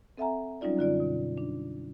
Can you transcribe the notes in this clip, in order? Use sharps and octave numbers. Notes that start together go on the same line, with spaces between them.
C4 A4 E5 F#5 G#5 A#5
F#3 G3 C#4 D#4 F4 D5
F#2 D3 F4 D5
B2
D4